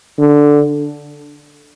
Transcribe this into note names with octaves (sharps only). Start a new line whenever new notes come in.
D3